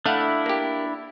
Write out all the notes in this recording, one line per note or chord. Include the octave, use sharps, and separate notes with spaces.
A3 D4 E4 F5 F#5
A#3 G4